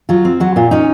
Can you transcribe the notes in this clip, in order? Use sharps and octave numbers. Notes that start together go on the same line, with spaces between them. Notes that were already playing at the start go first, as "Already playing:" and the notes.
F#3 F4
C4
F#3 F#4
A#2 F4
C#4 D#4